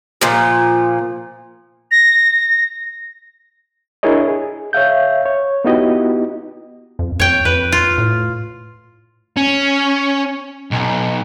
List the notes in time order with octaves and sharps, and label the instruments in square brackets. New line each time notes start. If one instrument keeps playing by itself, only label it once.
[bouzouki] A#2 F3
[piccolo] A#6
[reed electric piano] D4 E4 G#4 A#4 C#5 D#5
G#4
C#5 E5 F5 G6
C#5
B3 D#4 E4 F#4 G4 D#5
[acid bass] F2
[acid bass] F2 [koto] C#5 G5
[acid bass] F2 [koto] B4
[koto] F4
[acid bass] A2
[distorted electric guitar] C#4
B1